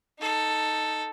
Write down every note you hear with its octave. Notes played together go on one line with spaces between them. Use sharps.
D#4 A4